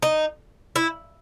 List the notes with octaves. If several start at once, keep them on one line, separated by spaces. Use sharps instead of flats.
D#4
E4